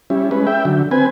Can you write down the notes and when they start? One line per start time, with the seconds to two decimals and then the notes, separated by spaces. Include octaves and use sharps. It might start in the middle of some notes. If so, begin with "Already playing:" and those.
0.10 G3 C#4 E4
0.31 G#3 C#4 B4
0.47 E5 G5
0.65 D3 F#3
0.91 C4 B4 G#5